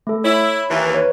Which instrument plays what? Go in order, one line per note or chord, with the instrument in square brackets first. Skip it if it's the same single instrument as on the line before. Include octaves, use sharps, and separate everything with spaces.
[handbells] A3 A4
[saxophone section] E4 [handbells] C#5
[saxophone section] D#2 E3
[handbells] B4 C#5